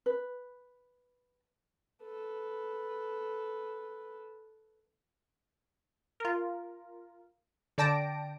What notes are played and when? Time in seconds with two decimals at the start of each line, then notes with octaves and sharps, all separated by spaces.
0.06 B4
2.03 A4 B4
6.20 F4 A#4
7.78 D3 D5 G5 A5 A#6 D7